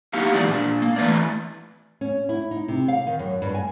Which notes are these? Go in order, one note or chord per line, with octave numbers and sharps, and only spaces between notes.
A#3 D#4 E4 F#4 G4 F5
E3 F3 G#3 B3 D5
A#2 D4
A#3
E3 A3 B4 D5
C#4
E4
D#4
C3
F5
D#3
F#2
G2
G#5